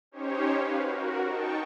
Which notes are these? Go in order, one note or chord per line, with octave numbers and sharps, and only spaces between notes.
C#4 D#4 G4 C5 C#5
B4 F5
F#4 A#4
D#4 G5 A5 C#6